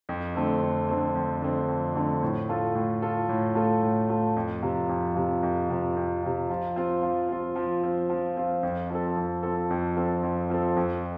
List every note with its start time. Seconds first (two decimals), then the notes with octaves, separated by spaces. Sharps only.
0.09 F2
0.35 D3 A3 C4
0.61 F2
0.89 D3 A3 C4
1.16 F2
1.42 D3 A3 C4
1.68 F2
1.95 D3 A3 C4
2.23 A2
2.49 A3 F4 A4
2.75 A2
3.02 A3 F4 A4
3.29 A2
3.55 A3 F4 A4
3.83 A2
4.09 A3 F4 A4
4.36 F2
4.63 C3 F3
4.89 F2
5.15 C3 F3
5.43 F2
5.70 C3 F3
5.97 F2
6.23 C3 F3
6.50 F3
6.76 C4 F4
7.03 F3
7.29 C4 F4
7.56 F3
7.83 C4 F4
8.10 F3
8.37 C4 F4
8.63 F2
8.90 F3 C4 A4
9.17 F2
9.43 F3 C4 A4
9.70 F2
9.96 F3 C4 A4
10.23 F2
10.50 F3 C4 A4
10.77 F2